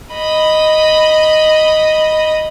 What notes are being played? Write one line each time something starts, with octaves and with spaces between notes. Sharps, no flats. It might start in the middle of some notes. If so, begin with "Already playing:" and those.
D#5 B5